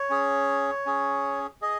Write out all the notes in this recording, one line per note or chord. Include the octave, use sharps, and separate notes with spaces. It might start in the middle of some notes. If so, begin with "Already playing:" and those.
Already playing: C#5
C#4 G#4
C#4 G#4
G#4 D#5